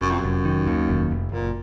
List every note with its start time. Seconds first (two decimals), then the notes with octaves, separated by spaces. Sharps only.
0.01 F1 F#2
0.12 F2
0.20 F1 F#2
0.45 D#3
0.67 D#2
0.88 F1
1.11 F1
1.32 F#1 A#2